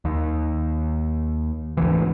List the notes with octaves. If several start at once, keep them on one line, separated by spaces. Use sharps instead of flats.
D#2
G#1 D2 E3